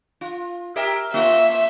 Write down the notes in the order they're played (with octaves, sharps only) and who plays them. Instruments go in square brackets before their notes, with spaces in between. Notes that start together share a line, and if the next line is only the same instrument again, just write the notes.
[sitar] F4
G4 A#4 E5
[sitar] A#3 F4 [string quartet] E5